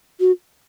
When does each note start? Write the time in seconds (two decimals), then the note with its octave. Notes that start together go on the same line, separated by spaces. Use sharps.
0.20 F#4